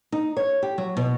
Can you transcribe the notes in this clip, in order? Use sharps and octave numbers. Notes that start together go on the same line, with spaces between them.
D#4
C#5
G4
F#3
B2